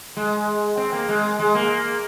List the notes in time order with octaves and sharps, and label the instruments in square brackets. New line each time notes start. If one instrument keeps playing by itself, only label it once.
[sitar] G#3
C4
A#3
G#3
G#3
A#3